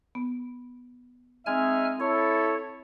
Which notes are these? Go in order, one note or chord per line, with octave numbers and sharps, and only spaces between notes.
B3
G#3 C4 D#4 D#5 E5 G#5 F6
E4 A4 C#5